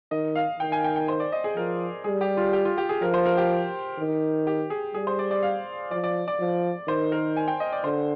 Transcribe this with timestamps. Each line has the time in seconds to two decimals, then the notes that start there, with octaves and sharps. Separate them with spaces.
0.11 D#3 D#5
0.35 F5
0.60 D#3 G5
0.72 G#5
0.84 G5
0.96 G5
1.08 C5
1.20 D5
1.32 D#5
1.44 G#4
1.56 F3 A#4
2.04 G3 G#4
2.21 G4
2.37 F4
2.53 G4
2.65 F4
2.78 G4
2.89 G#4
3.02 F3 A#4
3.14 C5
3.26 A#4
3.37 G4
3.98 D#3
4.47 G4
4.70 G#4
4.94 G3 G#4
5.07 C5
5.19 D5
5.31 D5
5.43 F5
5.91 F3 D5
6.04 D5
6.28 D5
6.40 F3
6.88 D#3 C5
7.12 A#4
7.37 G#5
7.48 G5
7.60 D#5
7.72 D5
7.84 D3 C5